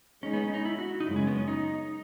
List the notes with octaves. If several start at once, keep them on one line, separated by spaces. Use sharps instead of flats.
G#3 C#4 D#4 G#4
B3
C#4
D#4
E4
F#4
D#4
F#2 C#3 G#3 E4
C#4
B3
C#4
D#4